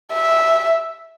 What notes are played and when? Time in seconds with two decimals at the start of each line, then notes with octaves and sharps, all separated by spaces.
0.13 E5